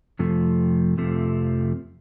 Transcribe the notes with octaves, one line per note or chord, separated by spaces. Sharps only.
F2 C3 F3 A3
F2 C3 F3 A3